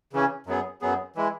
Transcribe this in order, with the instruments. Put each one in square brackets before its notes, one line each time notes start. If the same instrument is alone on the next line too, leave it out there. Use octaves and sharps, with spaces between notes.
[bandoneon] C#3 E3 C#4
F#2 F#3 B3 G#4
F#2 F#3 B3 G#4
E3 G#3 E4